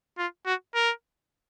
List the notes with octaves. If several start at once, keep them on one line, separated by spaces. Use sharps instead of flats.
F4
F#4
A#4